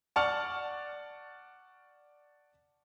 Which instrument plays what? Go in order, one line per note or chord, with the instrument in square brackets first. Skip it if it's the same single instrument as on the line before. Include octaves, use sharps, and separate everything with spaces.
[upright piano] D5 F#5 A5 C#6 F6